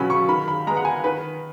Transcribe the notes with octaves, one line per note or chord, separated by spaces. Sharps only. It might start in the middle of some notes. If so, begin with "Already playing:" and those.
Already playing: B2 F#3 C#4 B5
C#6
D#3 B5
B5
G#3 B3 A#5
F#5
G#5
D#3 B4